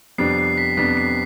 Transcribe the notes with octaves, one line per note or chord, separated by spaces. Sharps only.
F2 C3 G3 B3 D4 C7
C7
B6
F2 C3 G3 B3 D4 B6
C7